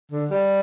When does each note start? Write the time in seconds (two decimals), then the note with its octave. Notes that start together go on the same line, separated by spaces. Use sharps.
0.12 D3
0.30 G3